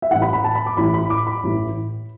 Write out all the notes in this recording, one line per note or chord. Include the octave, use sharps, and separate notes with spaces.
E5
A1 A2 E3 F#5
B5
B5
A5
B5
D6
A1 A2 E3 B5
B5
D6
B5
A1 A2 E3